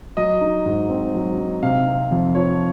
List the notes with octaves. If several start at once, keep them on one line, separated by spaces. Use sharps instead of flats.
F#3 D#5
D#4
G#2
C4
F#3
D#4
C3 F5
C4
F2
F3 C#5